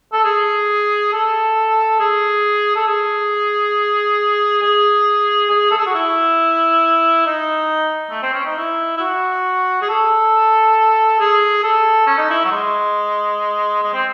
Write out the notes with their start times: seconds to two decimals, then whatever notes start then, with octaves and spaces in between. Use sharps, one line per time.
0.13 A4
0.25 G#4
1.12 A4
2.00 G#4
2.76 A4
2.87 G#4
4.62 G#4
5.50 G#4
5.71 A4
5.78 G#4
5.86 F#4
5.95 E4
7.26 D#4
8.10 A3
8.23 C4
8.33 C#4
8.46 D#4
8.58 E4
8.97 E4
9.00 F#4
9.82 G#4
9.89 A4
11.20 G#4
11.63 A4
12.07 C#4
12.18 D#4
12.30 E4
12.45 F#3
12.51 G#3
13.83 G#3
13.94 C4